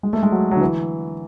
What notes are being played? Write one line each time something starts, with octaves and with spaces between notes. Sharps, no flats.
G#3
A3
G#3
F#3
F#3
D3
E3